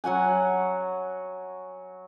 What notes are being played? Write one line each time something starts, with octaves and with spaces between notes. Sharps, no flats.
F#3 F#4 F#5 G#5